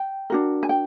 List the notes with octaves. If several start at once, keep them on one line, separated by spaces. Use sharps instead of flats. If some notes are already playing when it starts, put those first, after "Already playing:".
Already playing: G5
D4 F#4 A#4
G#5
G5